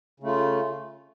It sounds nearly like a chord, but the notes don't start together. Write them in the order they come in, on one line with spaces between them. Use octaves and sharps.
C#3 A3 F4